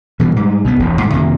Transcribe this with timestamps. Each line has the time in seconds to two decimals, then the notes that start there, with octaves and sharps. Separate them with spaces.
0.20 B2 E3 F3 G3
0.36 G#2 G3
0.64 B1 B2 F#3 B3
0.80 E1 A1 D#2
1.01 G#2 G3
1.13 F2 C3 D#3 A#3